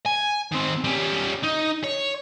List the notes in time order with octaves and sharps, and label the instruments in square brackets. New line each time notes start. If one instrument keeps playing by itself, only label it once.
[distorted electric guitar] G#5
D#3 C4
G3 C#4
D#4
C#5